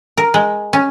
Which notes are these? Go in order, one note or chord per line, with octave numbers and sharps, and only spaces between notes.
A#4
G#3
C#4